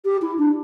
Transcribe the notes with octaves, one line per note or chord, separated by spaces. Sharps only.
G4
E4
D4